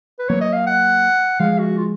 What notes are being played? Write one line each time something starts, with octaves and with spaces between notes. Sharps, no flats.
B4
F#3 A#3 C#5
D#5
F5
F#5
F3 G#3 F5
F#4
F4